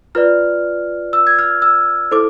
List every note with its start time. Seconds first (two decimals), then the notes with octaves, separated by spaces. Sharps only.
0.15 F4 B4 D5 F6
1.13 E6
1.27 G#6
1.39 F6
1.62 E6
2.11 E4 A4 C5 D6